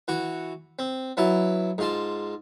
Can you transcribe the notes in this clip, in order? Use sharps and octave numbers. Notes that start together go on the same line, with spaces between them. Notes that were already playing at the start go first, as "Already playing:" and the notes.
E3 F#4 C#6
C4
F#3 B3 E4 A5
G#2 F4 A5